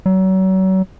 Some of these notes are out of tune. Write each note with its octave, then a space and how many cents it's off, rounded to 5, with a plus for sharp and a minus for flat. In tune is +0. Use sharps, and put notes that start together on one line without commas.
F#3 +35